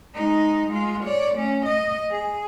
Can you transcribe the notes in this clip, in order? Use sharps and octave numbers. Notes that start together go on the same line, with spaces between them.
G#3 D#4
G#3 F4
C#5 D5
A3 C#4
D#5
G#4